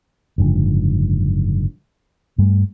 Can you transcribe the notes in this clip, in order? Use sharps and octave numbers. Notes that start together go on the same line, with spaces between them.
F#1 G#2 D3 F3
G2 G3 A3